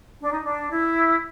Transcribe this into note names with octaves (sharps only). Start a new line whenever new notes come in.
D4
D#4
D4
E4